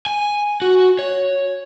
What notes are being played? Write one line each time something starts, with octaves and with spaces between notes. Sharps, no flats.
G#5
F#4
C#5